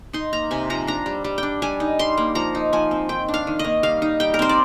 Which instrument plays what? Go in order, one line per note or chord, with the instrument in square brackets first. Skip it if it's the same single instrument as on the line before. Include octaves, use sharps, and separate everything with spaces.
[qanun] D#4 C6
A#3 A#5
C3 G#5
F3 A#5
D4 A#5
G3
G3
D4 G5
G3 G#5
D#4
G3 C6
A#3
F3 A#5
D#4
F3 G#5
C4
D#3 G5
D4
F5
D#3
D#5
A#3
G3 F5
D#4
G3 G5
A#4
C4 C5
D5